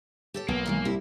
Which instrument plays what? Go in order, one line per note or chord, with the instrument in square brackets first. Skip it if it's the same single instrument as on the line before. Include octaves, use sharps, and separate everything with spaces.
[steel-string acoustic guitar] G4 A4 C#5
[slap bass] B1 [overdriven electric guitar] A#3 [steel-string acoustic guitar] B3
[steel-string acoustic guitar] D#3 E3 G#3
[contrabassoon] C2 [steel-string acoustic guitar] E4